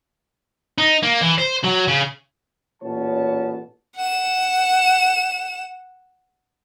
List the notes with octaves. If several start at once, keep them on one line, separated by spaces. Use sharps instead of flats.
D#4
A#3
E3
C5
F#3
C#3
A1 A#2 B3 C#4 C#5 A5
F#5 E7